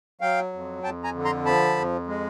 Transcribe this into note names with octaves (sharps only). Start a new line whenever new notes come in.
F#3 F5 G5
F2
F2 G5 A5
G#5 A#5
D3
A#5 C6
F3 A5 B5
F2
G#3